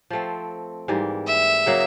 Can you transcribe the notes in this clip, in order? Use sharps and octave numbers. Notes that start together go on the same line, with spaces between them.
F3 A3 C4
G#2 E3 G3 A#3
E5
C#3 F#3 A#3